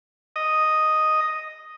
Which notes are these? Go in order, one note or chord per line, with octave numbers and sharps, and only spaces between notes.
D#5